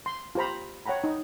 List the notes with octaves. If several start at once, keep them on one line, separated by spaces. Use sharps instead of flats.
C6
F4 G4 C5 A#5 B5
C#5 F#5 G5 A#5 B5
D#4